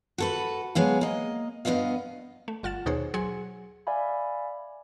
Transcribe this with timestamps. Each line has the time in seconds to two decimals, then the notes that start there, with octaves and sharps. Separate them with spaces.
0.18 F#4 A4 B4
0.75 F#3 G#3 B3 F5
1.01 A#3 D#5
1.65 G2 C3 B3 D#5 F5
2.48 A3
2.63 G1 F4 F#5 A6 E7
2.86 D#2 B2 D#4 G#4 C5 C#5
3.14 F#3 G#4 F#5 G#5 C6 C#7
3.87 D5 E5 F5 G#5 B5